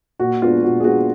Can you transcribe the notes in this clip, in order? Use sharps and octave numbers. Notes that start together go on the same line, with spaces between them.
A#2 F#4
G#3 B3 D4 F4
A#2 F#4
G#4
G#3 B3 D4 F#4